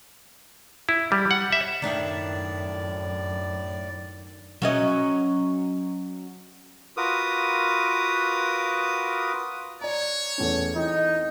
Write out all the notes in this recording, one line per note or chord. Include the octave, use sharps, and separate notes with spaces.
E4
G3
F#5
E5
F#2 A2 D#3 D4 E4 D5
F#3 C#4 D#5
F4 F#4 A#4 B4 D6 D#6
C#5 D5 A#5
E2 A3 C#4
E3 C4 D#4